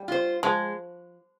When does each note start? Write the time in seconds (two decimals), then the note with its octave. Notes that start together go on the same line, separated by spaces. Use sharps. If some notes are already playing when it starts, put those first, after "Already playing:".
Already playing: G3
0.08 F4 C5
0.43 F3 G#3